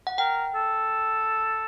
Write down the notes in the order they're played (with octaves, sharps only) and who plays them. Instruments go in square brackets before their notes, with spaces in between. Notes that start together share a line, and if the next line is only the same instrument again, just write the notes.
[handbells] F#5
[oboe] A#4 [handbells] G5
[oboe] A4